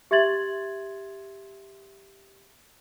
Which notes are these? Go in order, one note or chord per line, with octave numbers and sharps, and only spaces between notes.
G4 E5 C6 G#6 A6 F#7